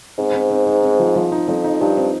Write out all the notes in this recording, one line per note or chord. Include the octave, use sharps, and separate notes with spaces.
G#2 C4
C4
C4
D#4
C4
F3
F3
D#4
F2 F3
D#4
G2 D#4
C4